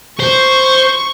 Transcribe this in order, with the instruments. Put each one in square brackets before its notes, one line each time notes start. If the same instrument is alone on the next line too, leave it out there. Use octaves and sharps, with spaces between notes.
[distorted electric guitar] C5 [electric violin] C#6